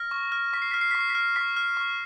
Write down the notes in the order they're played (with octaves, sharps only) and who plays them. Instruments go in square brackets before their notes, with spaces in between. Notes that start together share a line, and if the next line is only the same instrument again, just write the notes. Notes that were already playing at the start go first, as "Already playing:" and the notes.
Already playing: [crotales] F6 A#6
C#6
F6
C#6 B6
C7
F6 B6
C7
C#6 B6
C7
B6
F6
C#6 B6
F6
C#6